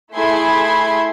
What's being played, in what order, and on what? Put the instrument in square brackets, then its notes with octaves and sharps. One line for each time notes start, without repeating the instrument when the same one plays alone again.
[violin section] A3 E4 G#4 E5 C6 G#6